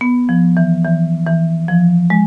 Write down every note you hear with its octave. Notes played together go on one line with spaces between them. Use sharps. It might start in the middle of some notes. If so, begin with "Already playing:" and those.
B3
F3
E3
E3
E3
F3
G#3